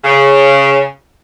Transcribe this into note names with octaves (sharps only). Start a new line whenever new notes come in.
C#3